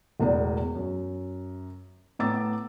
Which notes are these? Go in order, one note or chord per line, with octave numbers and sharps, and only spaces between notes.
E1 E2 A2 A#4 D5
F#2
A2 B3 A#5 D6 E6 A6